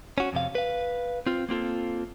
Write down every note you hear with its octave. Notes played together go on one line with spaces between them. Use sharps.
C#4 F#4
F2 C3 F5
B4 F5
C4 F4
A#3 C4 F4 A4